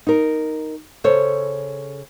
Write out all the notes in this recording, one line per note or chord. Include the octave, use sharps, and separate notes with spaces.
D#4 A#4
C#3 A4 C5 C#5